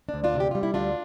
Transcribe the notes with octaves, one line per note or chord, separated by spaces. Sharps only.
D4
D2
D4 F4
C3
G4
G3 F4
E4
D2 D4 F4